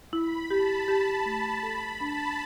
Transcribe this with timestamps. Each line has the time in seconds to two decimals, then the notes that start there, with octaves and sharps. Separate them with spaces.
0.13 E4 B5
0.50 G4 A5
0.87 G4 A5
1.26 A3
1.63 A4 B5
2.01 D4 A5